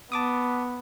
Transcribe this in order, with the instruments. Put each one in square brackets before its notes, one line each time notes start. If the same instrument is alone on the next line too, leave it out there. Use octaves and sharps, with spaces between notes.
[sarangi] B3 [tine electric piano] A5 D6 D#6